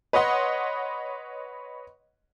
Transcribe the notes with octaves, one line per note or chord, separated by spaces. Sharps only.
B4 C#5 D#5 F#5 C6